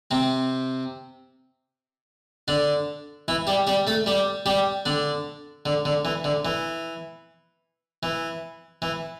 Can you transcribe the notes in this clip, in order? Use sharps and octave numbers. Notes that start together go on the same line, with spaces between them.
C3 C4
D3 D4
E3 E4
G3 G4
G3 G4
A3 A4
G3 G4
G3 G4
D3 D4
D3
D3
E3
D3
E3
E3
E3